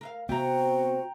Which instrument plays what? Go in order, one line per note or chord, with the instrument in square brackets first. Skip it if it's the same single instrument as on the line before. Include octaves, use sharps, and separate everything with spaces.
[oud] A#4 E5 F5
[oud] C3 C4 [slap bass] B3 [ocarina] F#4 [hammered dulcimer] G5 A#5